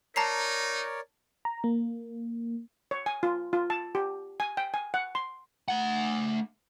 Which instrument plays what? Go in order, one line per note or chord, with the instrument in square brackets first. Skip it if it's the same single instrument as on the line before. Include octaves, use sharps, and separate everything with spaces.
[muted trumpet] D#4 [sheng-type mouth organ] A#4 C#5 D5 [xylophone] A5 A#5 C7
[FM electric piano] A#5
A#3
[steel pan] C#5
G#5
F4
F4
A5
G4
G#5
G5
G#5
F#5
C6
[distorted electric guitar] A3 F#5